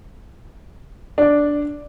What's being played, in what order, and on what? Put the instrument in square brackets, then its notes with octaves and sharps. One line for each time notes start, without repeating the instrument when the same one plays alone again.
[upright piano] D4 D5